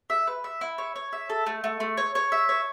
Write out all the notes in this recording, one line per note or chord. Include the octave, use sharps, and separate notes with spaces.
E5
B4
E5
E4
C#5
C#5
E5
A4
A3
A3
A3
C#5
C#5
E5
C#5